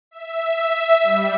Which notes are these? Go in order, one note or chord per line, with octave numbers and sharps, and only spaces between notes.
E5
G3